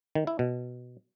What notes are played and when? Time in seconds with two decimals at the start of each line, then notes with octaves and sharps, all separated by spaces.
0.15 D#3
0.27 E4
0.39 B2